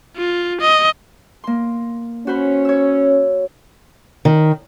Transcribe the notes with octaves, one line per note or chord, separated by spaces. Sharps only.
F4
D#5
A#3 C6
C#4 F#4 C5 B5
C#5 E6
D#3